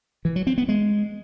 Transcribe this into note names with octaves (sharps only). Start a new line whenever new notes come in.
E3
F#3
C4
B3
G#3